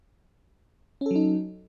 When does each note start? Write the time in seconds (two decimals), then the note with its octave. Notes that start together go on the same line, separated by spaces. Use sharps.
1.01 C#4
1.06 A4
1.11 F#3
1.16 D#4